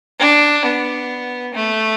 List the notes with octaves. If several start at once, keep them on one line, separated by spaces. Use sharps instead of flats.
D4
B3
A3